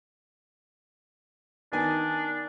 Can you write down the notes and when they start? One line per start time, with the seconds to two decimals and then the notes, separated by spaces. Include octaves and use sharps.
1.73 D#3 B3 D4 G#5